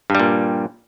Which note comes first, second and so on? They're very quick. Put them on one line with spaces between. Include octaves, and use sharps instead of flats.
G2 G3 A#2